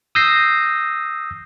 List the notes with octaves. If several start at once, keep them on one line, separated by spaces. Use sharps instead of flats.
D#6 E6 G6 A#6 C7